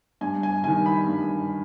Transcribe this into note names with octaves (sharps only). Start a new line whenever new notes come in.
G2 G#5
G#5
D#3 G3 G#5
B5
G2